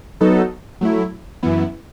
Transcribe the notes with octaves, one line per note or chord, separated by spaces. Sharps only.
F#3 B3 D#4 A4
F#3 A3 E4
F#2 E3 B3 E4